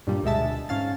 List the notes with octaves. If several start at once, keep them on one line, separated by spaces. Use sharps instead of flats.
G2 A#2 G3
D2 B2 G#3 E5 A5
G#2 C#4 F5 A6